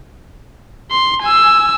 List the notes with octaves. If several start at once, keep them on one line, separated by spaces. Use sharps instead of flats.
C6
G#5 E6